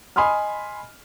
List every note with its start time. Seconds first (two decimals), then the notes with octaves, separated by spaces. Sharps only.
0.16 D#5 G#5 B5 C6 D#6 F6